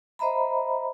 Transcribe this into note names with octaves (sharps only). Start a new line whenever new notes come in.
C5 D#5 E5 A#5 B5